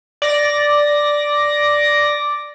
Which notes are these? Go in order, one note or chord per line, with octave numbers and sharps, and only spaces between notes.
D5 A#6